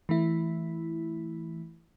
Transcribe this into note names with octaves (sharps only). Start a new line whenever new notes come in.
E3 A3 E4